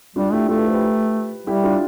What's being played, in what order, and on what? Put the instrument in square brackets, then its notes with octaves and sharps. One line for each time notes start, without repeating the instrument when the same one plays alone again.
[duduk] G3 [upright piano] D4 F4
[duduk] A3 [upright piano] E4 G4
[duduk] A3 [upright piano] F4 A4
[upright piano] G4 B4
A4 C5
G4 B4
[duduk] G3 [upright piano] E4 G4
[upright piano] D4 F4